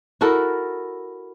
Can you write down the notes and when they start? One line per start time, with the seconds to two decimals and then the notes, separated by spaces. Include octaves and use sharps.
0.21 E4 F#4 A4 A#4